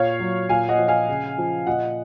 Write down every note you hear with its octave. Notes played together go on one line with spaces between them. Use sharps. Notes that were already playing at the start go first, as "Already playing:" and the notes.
Already playing: A#2 C#5 F5
F#3
A#2 F5 G#5
D#5 F#5
F3
F5 G#5
C#3
F3
A#2 D#5 F#5